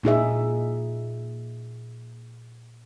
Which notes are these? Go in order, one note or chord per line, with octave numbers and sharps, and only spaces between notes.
A#2 D#4 G#4 E5